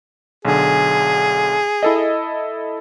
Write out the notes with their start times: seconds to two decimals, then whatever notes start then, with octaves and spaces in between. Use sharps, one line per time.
0.45 B1 D3 G#4
1.83 E4 A4 D#5